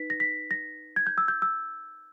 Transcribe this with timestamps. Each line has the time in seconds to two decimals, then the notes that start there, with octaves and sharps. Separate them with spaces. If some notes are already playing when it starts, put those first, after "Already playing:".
Already playing: D#4 B4 B6
0.10 A#6
0.20 B6
0.51 A#6
0.96 G#6
1.07 G6
1.18 E6
1.28 G6
1.42 E6